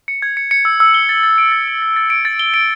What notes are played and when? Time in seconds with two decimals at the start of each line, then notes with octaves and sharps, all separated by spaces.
0.08 C#7
0.22 G#6
0.37 C#7
0.51 C#7
0.65 E6
0.80 E6
0.94 G7
1.09 A6
1.23 A6
1.38 D7
1.52 A6
1.68 D7
1.82 A6
1.96 A6
2.10 D7
2.25 A6
2.39 G7
2.54 D7